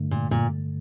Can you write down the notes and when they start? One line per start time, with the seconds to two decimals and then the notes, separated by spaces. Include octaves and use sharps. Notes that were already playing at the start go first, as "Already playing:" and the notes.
Already playing: G2 D3 A3
0.11 A#2
0.31 A#2